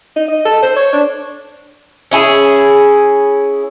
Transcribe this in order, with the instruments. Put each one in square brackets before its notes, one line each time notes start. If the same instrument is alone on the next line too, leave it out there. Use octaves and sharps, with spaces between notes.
[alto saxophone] D#4
D#5
A4
C5
C#5
D4
[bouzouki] C#4 E4 G#4